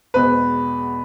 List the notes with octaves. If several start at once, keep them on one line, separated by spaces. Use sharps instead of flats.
E2 B2 G#3 B4